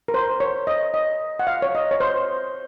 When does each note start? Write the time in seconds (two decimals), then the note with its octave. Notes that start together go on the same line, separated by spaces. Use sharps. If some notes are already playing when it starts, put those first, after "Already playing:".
0.08 A#4
0.14 C5
0.40 C#5
0.67 D#5
0.94 D#5
1.39 F#5
1.47 F5
1.62 C#5
1.75 D#5
1.91 C#5
2.00 C5